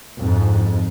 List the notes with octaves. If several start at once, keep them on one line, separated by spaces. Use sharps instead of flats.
F2 G#2